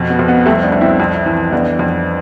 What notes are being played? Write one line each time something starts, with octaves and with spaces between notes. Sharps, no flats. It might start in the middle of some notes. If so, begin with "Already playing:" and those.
Already playing: F2 B2
B3
F2
B3
C2 A3 C4
C4
B3 D4
C2
C4 E4
F2
E3
F2 B3 D4
F2